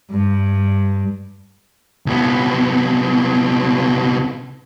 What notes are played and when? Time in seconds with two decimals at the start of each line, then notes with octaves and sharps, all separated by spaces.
0.11 G2
2.06 C2 B3